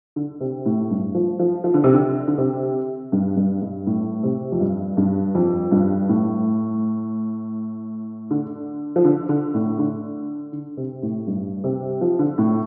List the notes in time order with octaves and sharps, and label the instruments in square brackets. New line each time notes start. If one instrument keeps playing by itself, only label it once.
[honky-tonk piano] D3
C3
A2
G2
F3
F3
F3
D3
C3
D3
D3
C3
G2
G2
G2
A2
C3
F2
G2
G2
F2
G2
A2
D3
F3
D3
D3
A2
D3
D3
C3
A2
G2
C3
F3
D3
A2